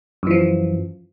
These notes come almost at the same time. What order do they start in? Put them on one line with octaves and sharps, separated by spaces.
F#2 E3 F3